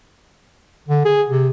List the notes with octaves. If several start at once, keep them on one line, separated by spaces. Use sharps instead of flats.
D3
G#4
C3